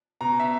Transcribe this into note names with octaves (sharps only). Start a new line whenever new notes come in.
B2 A#5
E5